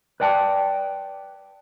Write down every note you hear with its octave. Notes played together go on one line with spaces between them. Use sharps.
B4 D5 G5 A5